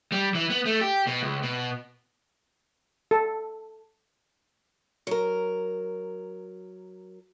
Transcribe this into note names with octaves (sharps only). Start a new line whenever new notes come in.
G3
E3
B3
A3
G4
B2
C#2
B2
A4
F#3 A#4